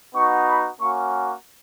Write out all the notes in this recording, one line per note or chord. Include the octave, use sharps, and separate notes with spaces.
B3 D#4 F#4 C#6
B5
A#3 C#4 F#4 C#6